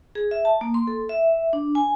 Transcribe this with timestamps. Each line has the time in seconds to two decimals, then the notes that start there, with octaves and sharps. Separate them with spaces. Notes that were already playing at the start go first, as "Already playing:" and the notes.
0.15 G#4
0.31 E5
0.45 A5
0.61 A#3
0.74 C6
0.87 A4
1.09 E5
1.53 D4
1.75 G#5